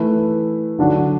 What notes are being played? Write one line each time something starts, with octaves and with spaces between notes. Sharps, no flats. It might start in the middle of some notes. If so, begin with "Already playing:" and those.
Already playing: E3 A3 E4 B4
D3 F#3 D4 F#4